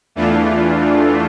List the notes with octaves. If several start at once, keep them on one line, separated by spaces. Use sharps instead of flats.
E2 E3 A3 D4 F4